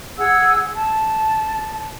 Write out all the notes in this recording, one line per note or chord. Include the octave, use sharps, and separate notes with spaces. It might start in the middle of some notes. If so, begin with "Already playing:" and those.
G#4 F#5 E6
A5